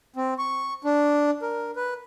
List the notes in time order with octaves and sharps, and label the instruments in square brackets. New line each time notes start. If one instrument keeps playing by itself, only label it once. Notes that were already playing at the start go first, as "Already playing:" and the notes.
[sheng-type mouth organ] C4
C#6
D4
A#4
B4